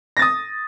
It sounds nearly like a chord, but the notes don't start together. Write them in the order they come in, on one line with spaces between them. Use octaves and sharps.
A#6 A6 D#6